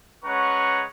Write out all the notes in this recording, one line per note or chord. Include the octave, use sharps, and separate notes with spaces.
G#3 C#4 B4 F#5 A#5 C#6